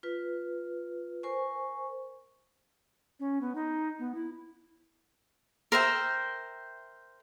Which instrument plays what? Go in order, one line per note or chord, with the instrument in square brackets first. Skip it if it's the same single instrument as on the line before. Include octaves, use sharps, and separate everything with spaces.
[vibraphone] F4 B4
A#4 C5 G#5 C#6
[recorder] C#4
B3
D#4
B3
E4
[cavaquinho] A#4 C5 E5 G5